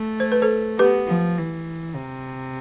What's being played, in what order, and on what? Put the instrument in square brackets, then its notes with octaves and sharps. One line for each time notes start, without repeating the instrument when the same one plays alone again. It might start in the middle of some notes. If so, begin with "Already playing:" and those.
Already playing: [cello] A3
[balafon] C5
B4
A4 C5
[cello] B3 [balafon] G4 B4
[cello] F3
E3
C3